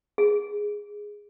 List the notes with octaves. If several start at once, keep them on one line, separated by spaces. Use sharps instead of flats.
G#4